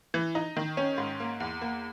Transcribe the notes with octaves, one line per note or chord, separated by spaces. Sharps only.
E3
D#4
D#3
C#4
G#2
A#3
E2
A#3